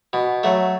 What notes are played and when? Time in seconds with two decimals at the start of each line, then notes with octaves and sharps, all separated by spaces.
0.13 B2
0.43 F#3 A3